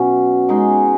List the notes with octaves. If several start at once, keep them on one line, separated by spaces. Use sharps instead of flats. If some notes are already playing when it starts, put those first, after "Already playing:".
Already playing: B2 F#3 C#4
G#3 D#4 G#4